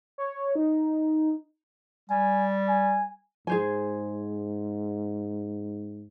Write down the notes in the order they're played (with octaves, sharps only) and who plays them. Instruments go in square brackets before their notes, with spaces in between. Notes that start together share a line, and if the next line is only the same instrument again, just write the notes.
[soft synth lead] C#5
D#4
[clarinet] G3 [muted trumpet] G#5
[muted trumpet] G#5
[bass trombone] G#2 [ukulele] G#4 C5 G#5